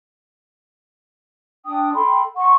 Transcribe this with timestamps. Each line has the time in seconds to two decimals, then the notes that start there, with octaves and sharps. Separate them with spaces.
1.65 D4 G5 D#6
1.94 A4 G5 B5 C6
2.36 F#5 C6 C#6